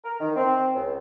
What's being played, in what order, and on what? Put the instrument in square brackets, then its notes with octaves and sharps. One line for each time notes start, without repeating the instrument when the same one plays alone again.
[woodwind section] A#4
D#3
C4
C#2